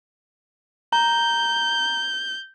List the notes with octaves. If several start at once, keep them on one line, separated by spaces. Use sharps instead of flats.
A#5 G6